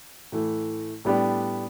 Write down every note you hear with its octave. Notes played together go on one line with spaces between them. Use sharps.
A2 E3 A3
A2 G3 B3 D4 G4